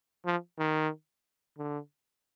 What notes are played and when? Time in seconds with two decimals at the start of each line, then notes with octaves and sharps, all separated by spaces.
0.26 F3
0.59 D#3
1.58 D3